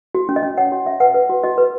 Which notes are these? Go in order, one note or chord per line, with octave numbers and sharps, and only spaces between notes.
F#4
C#4
D#5
C#4
C#5 F#5
F#4
C#4 E5
B4 F#5
B4
F#4
F#4 D#5
B4